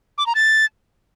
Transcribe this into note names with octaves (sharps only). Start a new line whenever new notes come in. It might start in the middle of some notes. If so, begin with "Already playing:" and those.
D6
A#5
A6